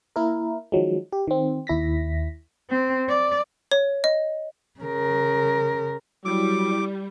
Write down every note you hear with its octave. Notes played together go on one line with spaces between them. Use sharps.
A#3 E4 A#4
D#3 F3 F#3 G#3
G4
D#3 C4
D#2 E4 A#6 B6
C4
D5
C#5
D#5
C#3 A#4
F#3 G3 E4 D6